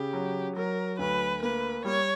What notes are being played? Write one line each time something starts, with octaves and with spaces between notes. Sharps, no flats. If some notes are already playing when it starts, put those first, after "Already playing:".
Already playing: C#3 G4
F#3
F#3 A#4
D2 B4
A#3 B4
G3 C#5